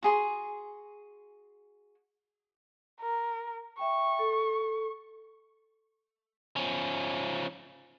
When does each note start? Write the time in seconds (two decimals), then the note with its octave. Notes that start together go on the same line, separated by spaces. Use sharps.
0.03 F#4 G#4 C6
3.01 A#4
3.79 E5 G5 C#6
4.19 A4
6.56 F3 C#4